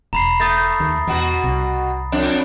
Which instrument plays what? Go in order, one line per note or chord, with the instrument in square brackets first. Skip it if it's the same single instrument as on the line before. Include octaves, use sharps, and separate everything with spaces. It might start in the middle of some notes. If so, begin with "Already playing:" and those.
[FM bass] E1 [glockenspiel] A#5 B5 C7
[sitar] A3 [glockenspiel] D#6 A6 A#6
[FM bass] D#2
[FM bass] E2 [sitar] B2 F#4
[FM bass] C2
[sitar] F2 D4